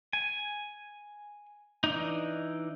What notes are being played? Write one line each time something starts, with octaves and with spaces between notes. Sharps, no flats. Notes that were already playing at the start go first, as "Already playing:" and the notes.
G#5
E3 D4 D#4